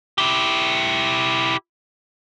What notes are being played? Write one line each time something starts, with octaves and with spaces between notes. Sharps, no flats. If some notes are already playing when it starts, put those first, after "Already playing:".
E4 G4